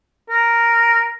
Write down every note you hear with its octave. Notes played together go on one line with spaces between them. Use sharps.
A#4